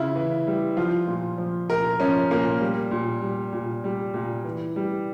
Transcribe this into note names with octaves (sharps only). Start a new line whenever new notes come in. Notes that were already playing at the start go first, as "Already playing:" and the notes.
Already playing: C#3 E4 F4
E3
G3
F3 F4
A#2
F3
A#2 A#4
F3 C#4
A#2 A#3
G3
A#2
G3
A#2
G3
A#2
E3
G3